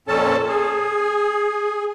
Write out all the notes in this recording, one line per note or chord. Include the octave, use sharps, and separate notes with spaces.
F2 A#2 C#4 A4 A5
G#4